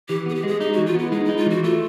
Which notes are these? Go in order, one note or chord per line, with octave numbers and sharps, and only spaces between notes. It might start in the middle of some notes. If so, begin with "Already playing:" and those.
E3 G4
B3 G#4
G4
G#3 G#4
D#4 G4
F#4
E3
F4
B3 E4
G#3 D#4
E4
D#4
F4
E3 F#4
A3 F4